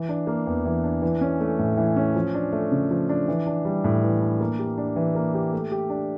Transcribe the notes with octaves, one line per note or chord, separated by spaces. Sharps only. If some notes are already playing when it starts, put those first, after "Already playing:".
Already playing: E3
D4
A#3
E2
E3
D4
E3
C#4
A3
A2
E3
C#4
F3
D4
A3
C#3
F3
D4
E3
D4
G3
A2
E3
D4
A#3
G4
D4
E3
A#3
G4
A3
G4
D4